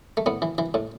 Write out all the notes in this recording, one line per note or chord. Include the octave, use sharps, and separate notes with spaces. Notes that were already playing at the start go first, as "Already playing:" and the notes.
A3
A2 B3
E3
E3
A2